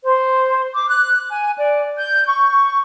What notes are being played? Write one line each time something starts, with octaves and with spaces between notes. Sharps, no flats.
C5
D6
F#6
G#5
D5
G6
C#6